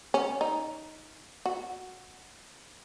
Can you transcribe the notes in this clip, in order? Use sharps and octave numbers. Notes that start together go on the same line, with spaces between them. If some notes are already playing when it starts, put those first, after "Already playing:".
C#4
D#4
F#4